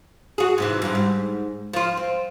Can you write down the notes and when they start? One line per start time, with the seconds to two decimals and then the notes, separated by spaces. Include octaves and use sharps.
0.38 F#4 G#4
0.58 G#2 C3 E3
0.82 G2 C3
0.95 G#2
1.73 F3 F4
1.97 C4